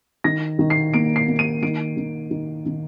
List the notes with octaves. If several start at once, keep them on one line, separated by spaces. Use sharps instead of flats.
D#3 A#6
D#3
C7
A#3 D7
C7
A#3
D#7
D#3 D7
D#3
D#3
D#3